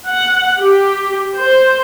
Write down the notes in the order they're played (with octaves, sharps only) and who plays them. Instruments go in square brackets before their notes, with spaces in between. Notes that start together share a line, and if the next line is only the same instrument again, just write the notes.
[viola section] F#5
G4
C5